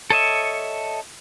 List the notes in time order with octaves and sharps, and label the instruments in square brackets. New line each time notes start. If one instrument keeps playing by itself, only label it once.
[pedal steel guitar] A4 C#5 D#5 E5